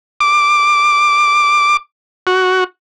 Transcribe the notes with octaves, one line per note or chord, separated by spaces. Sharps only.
D6
F#4